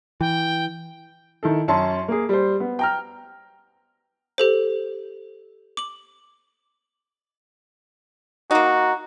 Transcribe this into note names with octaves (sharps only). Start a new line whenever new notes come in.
E3 G5
D#3 E4 A4
F#2 C#4 A5 C6
A#3 G#4
G3 C5
B3
G5 A#5 F6
G4 A4 C5
D6 F#7
A#3 D#4 F#4